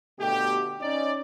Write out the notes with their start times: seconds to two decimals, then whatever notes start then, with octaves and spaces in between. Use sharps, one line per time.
0.19 B2 D3 A3 G4
0.81 C#4 D#4 D5